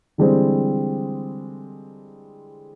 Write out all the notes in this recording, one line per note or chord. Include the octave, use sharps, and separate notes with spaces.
D3 E3 G3 G#3 C4 C5